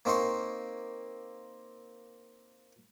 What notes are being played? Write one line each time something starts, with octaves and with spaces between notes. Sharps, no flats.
A#3 C4 D#4 C6 C#6